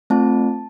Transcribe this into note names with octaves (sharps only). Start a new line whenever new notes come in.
A3 C4 F4 A5